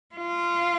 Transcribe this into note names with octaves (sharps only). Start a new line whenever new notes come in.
F4